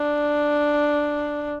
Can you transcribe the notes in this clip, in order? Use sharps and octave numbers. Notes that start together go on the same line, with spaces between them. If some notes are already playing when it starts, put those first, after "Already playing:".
Already playing: D4